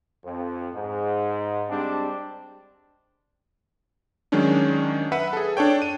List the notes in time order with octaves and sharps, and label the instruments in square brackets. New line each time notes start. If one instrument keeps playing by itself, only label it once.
[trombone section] F2
G#2
G3 G#3 C4 D4
[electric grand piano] D#3 F#3 G#3 C#4 D4
B4 E5 F#5
G#4 A4
D4 A4 C#5 G5
D#7